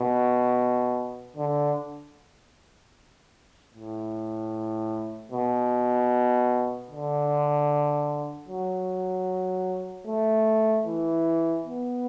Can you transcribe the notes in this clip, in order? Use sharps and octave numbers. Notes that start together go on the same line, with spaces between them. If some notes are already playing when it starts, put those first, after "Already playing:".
Already playing: B2
D3
A2
B2
D3
F#3
A3
E3
B3